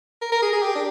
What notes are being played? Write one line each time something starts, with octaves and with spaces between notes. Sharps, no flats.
A#4
A#4
G#4
G#4
G4
D4